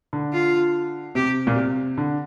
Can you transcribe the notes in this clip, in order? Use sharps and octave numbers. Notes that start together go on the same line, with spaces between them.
D3
F4
C3 G4
A#2
C3
D3